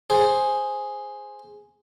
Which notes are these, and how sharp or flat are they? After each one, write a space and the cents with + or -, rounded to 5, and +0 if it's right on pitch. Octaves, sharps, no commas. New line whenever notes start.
G#4 +0 C5 +5